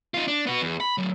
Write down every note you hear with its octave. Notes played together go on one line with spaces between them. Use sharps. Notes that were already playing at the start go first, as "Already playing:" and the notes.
D#4 F4
D4
B3 F#4
E2
B5
A2 F#3